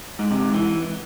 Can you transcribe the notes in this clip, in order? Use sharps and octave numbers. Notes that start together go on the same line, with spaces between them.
G#2
C3
G#2
E3